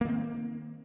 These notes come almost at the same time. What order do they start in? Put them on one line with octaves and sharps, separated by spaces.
A#3 D#3 C4